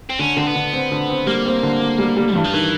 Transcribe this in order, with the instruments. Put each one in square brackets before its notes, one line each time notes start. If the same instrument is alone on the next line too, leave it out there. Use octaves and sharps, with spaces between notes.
[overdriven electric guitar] C4
[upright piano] D3 [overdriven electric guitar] C#4
[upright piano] D3 [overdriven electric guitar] C4
[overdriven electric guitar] B3
[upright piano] D3
C4
D3
C4
[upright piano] G3 [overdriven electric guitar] A#3
[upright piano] C4
D3
D3
G3
G3
[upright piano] G2 [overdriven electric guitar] E3
[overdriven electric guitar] F3
[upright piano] D#3 [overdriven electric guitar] E3